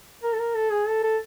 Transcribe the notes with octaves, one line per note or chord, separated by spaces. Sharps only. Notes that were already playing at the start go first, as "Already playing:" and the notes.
A#4
A4
A#4
A4
G#4
A4
A4